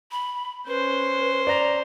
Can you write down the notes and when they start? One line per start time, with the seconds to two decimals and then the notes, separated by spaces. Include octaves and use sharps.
0.11 B5
0.67 C#4 B4 C5
1.47 D5 A#5 A#6